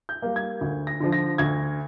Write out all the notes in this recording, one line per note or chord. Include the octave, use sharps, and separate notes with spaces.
G6
G3 A#3
G#6
D2
A#6
D3 F3
A#6
D2 G#6